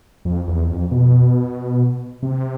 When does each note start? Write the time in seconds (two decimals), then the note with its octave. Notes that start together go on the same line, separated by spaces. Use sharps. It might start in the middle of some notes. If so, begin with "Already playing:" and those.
0.25 F2
0.47 E2
0.70 F2
0.91 B2
2.23 C3